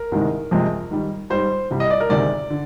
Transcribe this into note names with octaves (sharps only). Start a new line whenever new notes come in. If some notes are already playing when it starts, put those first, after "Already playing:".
Already playing: A#4
C2 C3 D#3 G#3
F2 C3 F3 G#3
G#2 D#3 G3
G#2 G3 C5
C2 C3 G3
D#5
D5
A#4
D2 C3 D#3 G#3 D5
D3